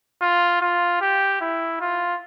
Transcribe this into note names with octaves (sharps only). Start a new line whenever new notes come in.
F4
F4
G4
E4
F4